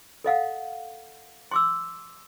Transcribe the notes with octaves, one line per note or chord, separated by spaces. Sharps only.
A4 D#5 F5 F#5
C6 D6 E6